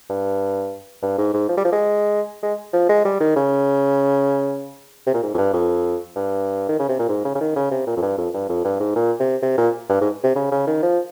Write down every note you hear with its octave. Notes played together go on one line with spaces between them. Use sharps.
G2
G2
G#2
G#2
F3
G3
F3
G#3
G#3
F3
G#3
G3
D#3
C#3
C3
A#2
G#2
F2
G2
F2
G2
D#3
C#3
C3
A#2
G#2
C#3
C#3
D#3
C#3
C3
A#2
F2
G2
F2
G2
F2
G2
G#2
A#2
C3
C3
A#2
G2
G#2
C3
C#3
C#3
D#3
F3